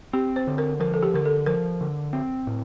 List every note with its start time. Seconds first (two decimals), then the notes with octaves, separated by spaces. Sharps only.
0.13 C4 G4
0.36 C5
0.47 D3
0.58 A#4
0.80 F3 A#4
0.94 A4
1.03 G4
1.14 D3 A#4
1.25 A4
1.46 F3 A#4
1.81 D3
2.13 C4
2.47 A2